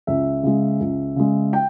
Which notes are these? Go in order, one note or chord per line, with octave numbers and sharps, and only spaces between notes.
C#2 E5
C#3 G#3
C#2
C#3 G#3
G5